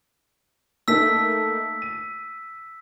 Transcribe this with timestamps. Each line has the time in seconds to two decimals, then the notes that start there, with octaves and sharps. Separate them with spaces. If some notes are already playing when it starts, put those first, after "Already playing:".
0.88 A3 A#3 D#4 E6 B6
1.82 D#7